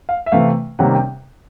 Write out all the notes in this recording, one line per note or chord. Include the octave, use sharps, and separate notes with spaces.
F5
E5
C3 E3 A3 F5
C3 D#3 G3 A#3 C#4 F#5
G5